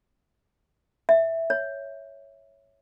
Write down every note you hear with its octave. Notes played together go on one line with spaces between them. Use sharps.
E5
C#5